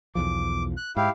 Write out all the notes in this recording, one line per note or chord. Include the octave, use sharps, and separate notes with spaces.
B1 E2 F3 D6
F#6
G#2 E4 G4 F5